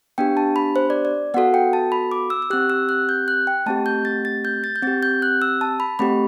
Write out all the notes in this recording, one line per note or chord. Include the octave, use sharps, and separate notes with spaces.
B3 D4 G4 G5
A5
B5
C5
D5
D5
B3 F#4 A4 F#5
G5
A5
B5
D6
E6
E6
C4 G4 F#6
E6
F#6
G6
F#6
G5
A3 C4 G4 A5
G6
A6
A6
G6
A6
G6
C4 G4 A6
G6
F#6
E6
A5
B5
A3 C4 G4 B5